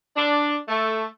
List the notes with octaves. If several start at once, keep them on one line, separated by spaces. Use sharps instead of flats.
D4
A3